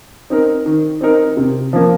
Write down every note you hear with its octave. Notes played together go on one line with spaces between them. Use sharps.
C4 D#4 A#4
D#3
C4 D#4 A#4
C3
F3 A#3